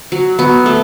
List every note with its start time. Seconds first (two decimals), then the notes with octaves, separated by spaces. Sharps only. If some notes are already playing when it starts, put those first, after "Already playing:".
0.12 F#3
0.39 F#3 B3
0.66 A3